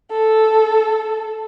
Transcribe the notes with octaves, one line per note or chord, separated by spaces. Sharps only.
A4